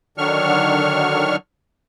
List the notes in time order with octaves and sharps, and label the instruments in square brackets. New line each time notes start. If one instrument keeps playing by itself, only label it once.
[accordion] D3 D#3 F#3 D4 C#6 F6